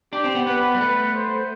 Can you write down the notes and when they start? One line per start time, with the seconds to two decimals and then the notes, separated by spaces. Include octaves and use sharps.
0.13 D4 G4
0.24 C4
0.35 B3
0.46 B3 B4
0.74 G3
0.80 A3 B4
1.14 C5